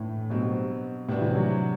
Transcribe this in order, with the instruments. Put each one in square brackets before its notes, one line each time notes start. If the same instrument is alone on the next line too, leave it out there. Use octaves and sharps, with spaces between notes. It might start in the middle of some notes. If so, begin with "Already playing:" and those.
Already playing: [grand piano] A2 [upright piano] E3 A3 D4
[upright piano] G2 F#3 C4 G4 [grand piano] B2
[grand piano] A2 [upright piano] C3 G3 B3 D4 F#4
[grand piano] E3
F#3